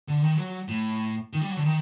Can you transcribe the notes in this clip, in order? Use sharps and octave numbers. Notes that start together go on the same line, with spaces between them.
D3
D#3
F#3
A2
D#3
G3
F#3
D3
D#3